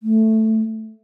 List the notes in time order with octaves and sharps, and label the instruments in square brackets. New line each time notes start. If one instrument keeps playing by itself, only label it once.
[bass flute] A3